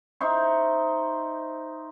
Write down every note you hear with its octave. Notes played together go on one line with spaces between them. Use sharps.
D#4 C5 E5 C#6